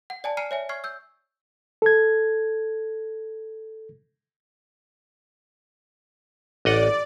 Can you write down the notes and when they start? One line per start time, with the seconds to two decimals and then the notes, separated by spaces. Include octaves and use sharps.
0.10 F#5
0.24 D5 G#5 A5
0.37 G#5 A#5 F6 C7 D#7
0.51 C#5 E5 G#5
0.69 C#6 F6 G#6 C7
0.84 E6 G6
1.82 A4 G#6
6.65 A1 D5 D#5 F#5